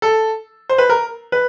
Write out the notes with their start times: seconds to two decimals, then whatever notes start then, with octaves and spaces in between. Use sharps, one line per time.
0.02 A4
0.69 C5
0.78 B4
0.90 A#4
1.32 B4